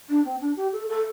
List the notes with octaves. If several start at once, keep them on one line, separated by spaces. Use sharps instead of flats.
D4
C4
D4
G4
A4
A4